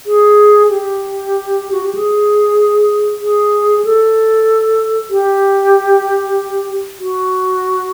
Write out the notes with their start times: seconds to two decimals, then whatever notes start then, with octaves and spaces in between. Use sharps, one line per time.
0.06 G#4
0.69 G4
1.72 F#4
1.83 G4
1.95 G#4
3.21 G#4
3.85 A4
5.10 G4
6.99 F#4